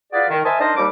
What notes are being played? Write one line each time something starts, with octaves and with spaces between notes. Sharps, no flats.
F4 F#4 G#4 B4 D5
D#3
A#4 C5 D#5 E5 G#5 A5
D4 D#4 A#4 C5 D#5 A5
D#2 G3 D6